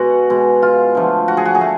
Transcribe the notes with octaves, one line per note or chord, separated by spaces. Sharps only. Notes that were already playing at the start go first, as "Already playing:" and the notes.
Already playing: B2 G#3 F#4
B2 G#3
F4
D3 F3 A3
F#4
G#4
F#4
G#4
A3